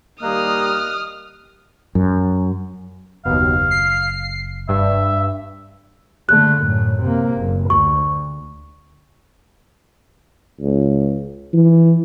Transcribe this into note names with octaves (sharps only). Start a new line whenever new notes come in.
D#2 G3 A#3 D#5 D#6 F6 F#6
F#2
F#1 D#2 B2 F5
C7
G2 E5
D3 A3 F#6
F#2 A2
C3 A#3
F#1
D2 C#6
C#2
E3